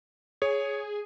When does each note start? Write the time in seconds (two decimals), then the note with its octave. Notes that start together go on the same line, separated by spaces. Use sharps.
0.42 G#4 C#5